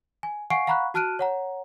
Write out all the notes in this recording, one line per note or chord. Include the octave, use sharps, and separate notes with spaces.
G#5
F5 F#5 G#5 C#6 C7 D7
F5 F#5 A#5 B5 C#6 F#6
F#4 A5 F6 F#6 D7 D#7
C#5 F#5 A#5